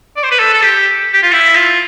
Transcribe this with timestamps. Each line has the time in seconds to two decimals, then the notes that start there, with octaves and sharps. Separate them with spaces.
0.16 D5
0.23 C5
0.31 B4
0.39 A4
0.53 A4
0.62 G4
1.13 G4
1.23 F4
1.32 E4
1.55 F4